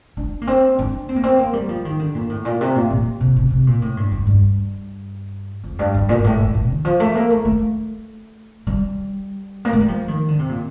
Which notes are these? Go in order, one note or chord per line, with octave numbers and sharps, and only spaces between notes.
D4
A#3
C4
D4
C4
A#3
C4
A#3
G3
F3
D#3
D3
A#2
A2
A#2
C3
A#2
A#2
C3
C3
C3
A#2
A2
G2
G2
G2
F2
G2
G2
A#2
G2
A2
A2
A2
D#3
F3
A3
A#3
A3
A3
G3
A#3
A3
G3
F3
D#3
D3
C3
A#2